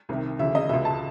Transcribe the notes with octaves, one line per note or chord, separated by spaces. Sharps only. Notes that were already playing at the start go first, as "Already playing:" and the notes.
C2 C3 D#3
D2 C#3 E3 E5
D#5
C#2 B2 E5
A5